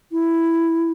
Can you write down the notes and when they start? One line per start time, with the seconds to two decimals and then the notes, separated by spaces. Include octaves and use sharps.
0.12 E4